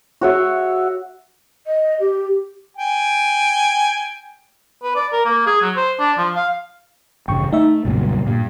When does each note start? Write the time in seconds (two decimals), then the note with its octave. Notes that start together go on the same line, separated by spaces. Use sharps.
0.21 F#4 C#5 E5
1.66 D#5
1.99 G4
2.77 G5 G#5
4.83 B4
4.96 D5
5.13 A#4
5.25 A#3
5.46 G#4
5.62 F#3
5.76 C5
6.00 D4
6.18 F3
6.35 F5
7.28 A1 G2 C#3 G5 C#6
7.53 A3 D#4 E5
7.85 B1 F#2 A#2 C#3 G3
8.27 G2 A#2